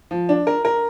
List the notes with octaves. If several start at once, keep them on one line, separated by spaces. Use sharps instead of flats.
F3
D4
A#4
A#4